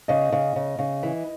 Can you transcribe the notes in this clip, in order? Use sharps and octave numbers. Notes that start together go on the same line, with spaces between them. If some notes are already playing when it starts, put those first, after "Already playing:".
C#3 D#5
C#3
C#3
C#3
E3